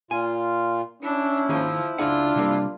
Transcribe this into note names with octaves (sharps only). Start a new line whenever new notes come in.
A#2 F4 G#5
C#4 D4 E4
D#3 F3 A#3 G#4
C#2 D4 F4 G#4 F#5
C3 G3 A#3